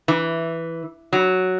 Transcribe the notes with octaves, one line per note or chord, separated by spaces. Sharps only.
E3
F#3